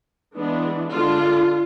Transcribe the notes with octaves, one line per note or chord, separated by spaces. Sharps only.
E3 G#3 B3 D4
D3 G#3 D4 F4